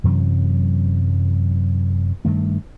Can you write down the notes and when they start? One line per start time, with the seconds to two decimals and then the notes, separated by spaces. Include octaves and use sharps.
0.04 F#2 C3 E3 F#3
2.25 G2 D#3 A3